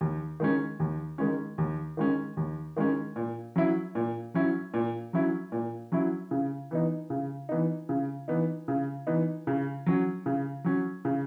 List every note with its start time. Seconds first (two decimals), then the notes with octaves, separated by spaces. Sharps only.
0.01 D#2
0.40 D#3 G#3 C#4
0.80 D#2
1.18 D#3 G#3 C#4
1.58 D#2
1.97 D#3 G#3 C#4
2.37 D#2
2.76 D#3 G#3 C#4
3.16 A#2
3.56 F#3 C#4 E4
3.95 A#2
4.34 F#3 C#4 E4
4.74 A#2
5.13 F#3 C#4 E4
5.52 A#2
5.92 F#3 C#4 E4
6.31 C#3
6.71 E3 B3 D#4
7.10 C#3
7.49 E3 B3 D#4
7.89 C#3
8.28 E3 B3 D#4
8.68 C#3
9.07 E3 B3 D#4
9.47 C#3
9.86 F#3 C#4
10.26 C#3
10.64 F#3 C#4
11.05 C#3